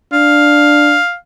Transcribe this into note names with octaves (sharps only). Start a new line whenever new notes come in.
D4 F5